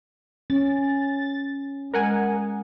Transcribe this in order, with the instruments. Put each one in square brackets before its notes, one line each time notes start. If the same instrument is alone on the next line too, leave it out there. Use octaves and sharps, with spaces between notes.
[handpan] C#4 [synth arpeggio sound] A6
[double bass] G#3 [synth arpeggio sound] A#4 F#5 G#5